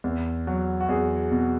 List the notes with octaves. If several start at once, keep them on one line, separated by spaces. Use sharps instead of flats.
E2
F#3
F#4
E2 G#4
B2